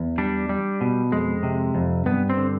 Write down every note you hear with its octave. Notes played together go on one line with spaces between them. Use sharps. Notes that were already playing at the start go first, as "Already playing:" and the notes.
Already playing: E2
G3 D4
G3
B2
F2 G#3
C3
F2
G2 B3
C4
D3